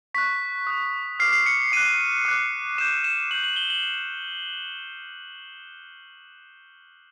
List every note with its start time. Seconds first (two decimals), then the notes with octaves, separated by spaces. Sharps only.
0.14 C#6 F#6 B6
0.67 D#6 F#6
1.20 D6 F6 C7
1.33 C7
1.46 C#7
1.72 D6 F#6 D#7
2.25 D6 F#6
2.78 D6 G6 E7
3.04 E7
3.31 D6 G6 F#7
3.44 F#7
3.56 G7
3.70 F#7